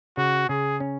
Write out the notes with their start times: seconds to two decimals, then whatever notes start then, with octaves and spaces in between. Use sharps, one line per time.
0.17 C#3 F#4
0.49 C#3 G#4
0.80 C#4